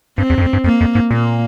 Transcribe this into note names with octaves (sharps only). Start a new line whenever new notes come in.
G2 C4
E2
G2
F2
G2
F2 A#3
F2
G#2
A#2 A#3